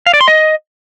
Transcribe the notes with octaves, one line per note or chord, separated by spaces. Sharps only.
F5
D5
C6
D#5